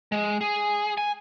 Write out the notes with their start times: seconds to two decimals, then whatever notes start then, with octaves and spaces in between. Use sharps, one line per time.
0.12 G#3
0.41 G#4
0.97 G#5